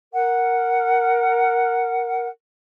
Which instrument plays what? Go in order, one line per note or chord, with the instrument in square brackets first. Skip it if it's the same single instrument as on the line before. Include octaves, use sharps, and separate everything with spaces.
[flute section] A#4 F#5